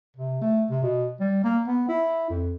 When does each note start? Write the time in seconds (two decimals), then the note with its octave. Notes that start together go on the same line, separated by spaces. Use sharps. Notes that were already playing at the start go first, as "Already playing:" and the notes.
0.17 C3
0.42 A3
0.71 C3
0.83 B2
1.20 G3
1.44 A#3
1.67 B3
1.89 E4
2.30 F2